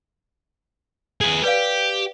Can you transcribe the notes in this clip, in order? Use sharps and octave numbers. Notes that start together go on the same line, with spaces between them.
G#4 B4
G4 B4 D5 F5